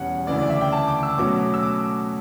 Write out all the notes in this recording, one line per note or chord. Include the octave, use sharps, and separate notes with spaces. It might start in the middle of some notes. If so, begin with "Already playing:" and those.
Already playing: E2 B2 G3 C#4 F#5
D2 C#3 E3 D5
D5
E5
G5
A5
D6
E6
B2 F#3 A3 C#4 D6
E6
D6